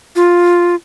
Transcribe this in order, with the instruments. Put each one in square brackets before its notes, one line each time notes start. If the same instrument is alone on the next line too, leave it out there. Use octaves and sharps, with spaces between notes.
[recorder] F4